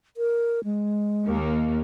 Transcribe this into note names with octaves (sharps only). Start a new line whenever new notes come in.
A#4
G#3
D#2 A#3